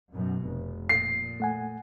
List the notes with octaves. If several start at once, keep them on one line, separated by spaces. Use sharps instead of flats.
F#2 B2
F1
A#2 C7
A3 F#5 G#5